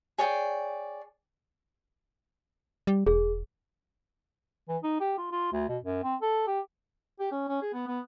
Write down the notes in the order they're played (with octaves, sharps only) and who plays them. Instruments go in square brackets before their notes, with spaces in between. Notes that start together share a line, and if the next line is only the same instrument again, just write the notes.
[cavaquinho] G#4 C#5 D5 G5
[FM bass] G3
[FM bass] E1 [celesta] G#4
[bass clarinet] E3
D#4
G4
F4
F4
D2
B2
F#2
C4
A4
G4
[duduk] G4
C#4
C#4
G#4
B3
B3